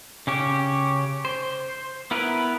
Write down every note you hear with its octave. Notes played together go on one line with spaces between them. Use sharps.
C#3 C#4 G4
C5
B3 E4 A#4 B4